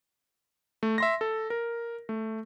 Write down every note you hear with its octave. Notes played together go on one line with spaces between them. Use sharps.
A3
E5 C6 A#6
A4
A#4
A3